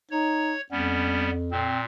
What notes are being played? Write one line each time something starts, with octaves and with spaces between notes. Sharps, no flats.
D#4 C#5
F2 G3 B3 C#4
A#2 C4